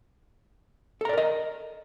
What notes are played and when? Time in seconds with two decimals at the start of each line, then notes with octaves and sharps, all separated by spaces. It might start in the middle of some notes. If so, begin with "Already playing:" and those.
1.01 A4
1.05 A#5
1.09 D5
1.13 A#4
1.17 D#5